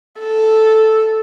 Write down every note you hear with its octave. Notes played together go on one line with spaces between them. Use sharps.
A4